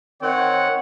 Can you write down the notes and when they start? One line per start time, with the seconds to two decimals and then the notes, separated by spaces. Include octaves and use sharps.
0.22 D#3 C4 C#5 F#5